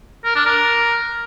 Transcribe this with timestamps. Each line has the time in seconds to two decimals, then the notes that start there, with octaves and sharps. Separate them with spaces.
0.25 A#4
0.35 D4
0.46 A#4